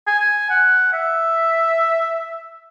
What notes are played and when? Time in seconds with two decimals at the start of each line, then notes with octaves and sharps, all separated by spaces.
0.07 G#5
0.50 F#5
0.93 E5